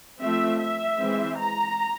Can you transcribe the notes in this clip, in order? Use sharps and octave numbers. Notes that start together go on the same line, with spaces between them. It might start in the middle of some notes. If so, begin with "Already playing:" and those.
F3 A3 C4 E5
E5
E3 G#3 C4
A#5